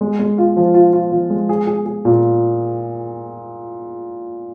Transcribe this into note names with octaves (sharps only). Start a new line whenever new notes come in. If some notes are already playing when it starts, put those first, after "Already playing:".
G#3
G#3
F4
F3
F4
F4
F3
G#3
G#4
G#4
G#4
A#2